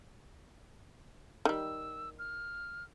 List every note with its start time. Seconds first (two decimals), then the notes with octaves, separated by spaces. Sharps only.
1.45 D#3 G3 E6
2.19 F6